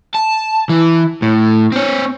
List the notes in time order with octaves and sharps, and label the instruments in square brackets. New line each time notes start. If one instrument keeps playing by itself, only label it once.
[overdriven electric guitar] A5
E3
A2
C4 C#5